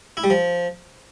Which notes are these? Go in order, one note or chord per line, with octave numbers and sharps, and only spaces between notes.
E4
G3
F3